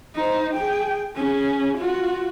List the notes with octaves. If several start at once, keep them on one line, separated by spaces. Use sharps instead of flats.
D#4 C5
G#4 G5
C#4 G#4
F4 F#4